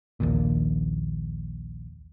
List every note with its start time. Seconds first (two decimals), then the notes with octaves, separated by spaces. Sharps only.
0.20 A#1 D#2 A#2